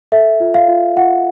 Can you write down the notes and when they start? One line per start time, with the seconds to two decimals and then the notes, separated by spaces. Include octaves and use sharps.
0.12 A4 E5
0.40 F4
0.54 F5
0.68 F4
0.96 F4 F#5